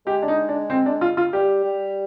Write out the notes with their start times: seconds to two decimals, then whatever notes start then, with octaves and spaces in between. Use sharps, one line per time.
0.06 G#3 G4
0.22 D4
0.28 D#4
0.49 D4
0.70 C4
0.86 D4
1.01 F4
1.17 F4
1.33 G3 G4
1.64 G3